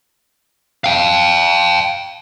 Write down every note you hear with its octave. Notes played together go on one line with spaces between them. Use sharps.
F5 G5